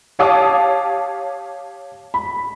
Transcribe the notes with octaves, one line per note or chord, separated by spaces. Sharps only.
G4 C#5 F5 A5 D6 D#6
B5